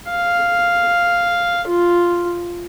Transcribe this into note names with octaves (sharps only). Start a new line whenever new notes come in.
F5
F4